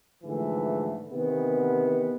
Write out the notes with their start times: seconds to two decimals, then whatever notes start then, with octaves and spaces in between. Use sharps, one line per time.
0.24 G#2 D3 E3 F3 A3
1.10 C3 D#3 E3 B3